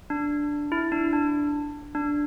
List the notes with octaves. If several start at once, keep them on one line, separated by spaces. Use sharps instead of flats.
D4
E4
D4
D4
D4